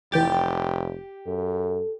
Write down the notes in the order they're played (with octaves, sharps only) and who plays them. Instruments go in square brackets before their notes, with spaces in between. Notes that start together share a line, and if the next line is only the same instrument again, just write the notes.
[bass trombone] F1 [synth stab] E3 G5 A6 [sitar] G4
[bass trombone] F#2 [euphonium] A4